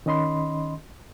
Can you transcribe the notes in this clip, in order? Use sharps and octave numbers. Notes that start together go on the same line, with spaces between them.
D#3 C#4 D#5 B5 C6